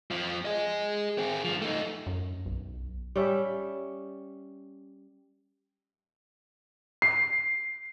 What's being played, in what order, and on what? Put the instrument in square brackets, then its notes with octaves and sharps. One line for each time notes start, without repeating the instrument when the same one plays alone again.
[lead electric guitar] F2 F3
G#4 D#5
C4 G#4
G2 F3
A3 D#4
[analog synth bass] F#2
B1
[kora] G3 C#4 E5
[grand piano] C7